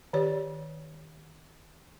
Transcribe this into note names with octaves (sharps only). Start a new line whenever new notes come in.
D#3 G4 C#5 D5